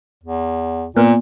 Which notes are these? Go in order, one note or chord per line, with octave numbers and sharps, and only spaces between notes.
E2
A#2 A#3 B3